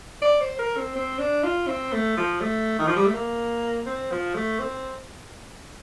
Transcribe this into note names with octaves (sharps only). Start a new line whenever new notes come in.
D5
C5
A#4
C4
C4
D4
F4
C4
A3
F3
A3
D#3
F3
G3
A3
A#3
C4
F3
A3
C4